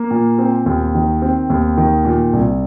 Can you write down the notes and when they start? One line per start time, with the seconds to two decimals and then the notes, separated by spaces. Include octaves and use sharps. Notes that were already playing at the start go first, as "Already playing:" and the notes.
Already playing: A#3
0.11 A#2
0.39 C4
0.66 D#2
0.95 D#3
1.22 C4
1.50 D#2
1.77 D#3
2.05 A#2
2.33 C2